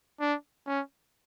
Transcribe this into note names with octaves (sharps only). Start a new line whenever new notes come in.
D4
C#4